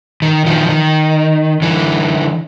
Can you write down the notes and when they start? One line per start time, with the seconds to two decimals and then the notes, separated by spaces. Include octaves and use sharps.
0.22 D#3
0.46 D#3 F3
0.69 D#3
1.62 D3 E3